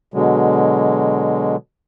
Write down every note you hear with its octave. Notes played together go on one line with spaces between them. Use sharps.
B2 D3 F#3 G#3